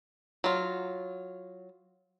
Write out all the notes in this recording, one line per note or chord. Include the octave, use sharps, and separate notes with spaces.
F#3 F4